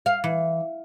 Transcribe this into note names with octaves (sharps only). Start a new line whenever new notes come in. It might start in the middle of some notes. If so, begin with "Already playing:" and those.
F5
E3